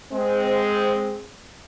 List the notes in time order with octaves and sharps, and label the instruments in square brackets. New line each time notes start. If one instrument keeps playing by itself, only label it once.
[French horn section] G#3 C4